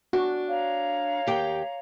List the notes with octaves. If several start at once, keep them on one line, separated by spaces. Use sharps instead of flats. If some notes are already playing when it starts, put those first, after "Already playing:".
D4 F#4
C#5 F5 A#5
D#2 G4 G5